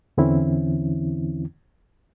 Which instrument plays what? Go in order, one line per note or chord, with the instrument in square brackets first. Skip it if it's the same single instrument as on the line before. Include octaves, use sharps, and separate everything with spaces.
[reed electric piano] E2 D3 E3 C4 C#4 E4